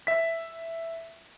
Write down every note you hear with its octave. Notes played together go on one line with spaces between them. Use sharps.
E5 B6